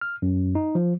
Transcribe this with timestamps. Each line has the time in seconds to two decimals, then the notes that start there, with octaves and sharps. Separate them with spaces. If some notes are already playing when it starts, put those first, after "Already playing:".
0.01 F6
0.22 F#2
0.55 D#4
0.75 F3